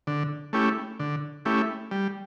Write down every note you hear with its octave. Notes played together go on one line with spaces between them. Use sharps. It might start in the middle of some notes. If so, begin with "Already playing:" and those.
D3
A3 C#4 E4 G4
D3
A3 C#4 E4 G4
G3